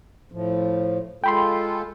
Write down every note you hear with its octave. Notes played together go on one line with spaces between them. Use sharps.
A2 F3
G#3 F4 A4 G5 B5 C6